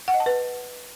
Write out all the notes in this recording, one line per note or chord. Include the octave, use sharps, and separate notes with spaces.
F#5
D#5
A5
B4